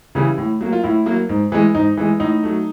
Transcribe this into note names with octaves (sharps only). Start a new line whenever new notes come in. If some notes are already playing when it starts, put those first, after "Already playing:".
C#3 E3 G3
A2
F#3 A#3
F4
A2 E4
F#3 A#3
G#2
E3 G#3
G#2 D#4
E3 G#3
A2 D#4
F#3 A3